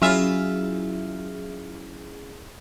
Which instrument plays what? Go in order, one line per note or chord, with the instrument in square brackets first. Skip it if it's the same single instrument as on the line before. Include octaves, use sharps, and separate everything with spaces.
[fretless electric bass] F#3 [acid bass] C#4 [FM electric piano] E4 G#4 [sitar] F4 E5